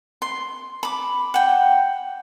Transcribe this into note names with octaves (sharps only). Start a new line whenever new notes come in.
C6
B5 D6
F#5 G5